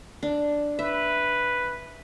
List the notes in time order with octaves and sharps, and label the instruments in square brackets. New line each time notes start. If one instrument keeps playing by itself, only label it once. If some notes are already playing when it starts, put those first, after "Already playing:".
[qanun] D4
[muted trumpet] B4 [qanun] E5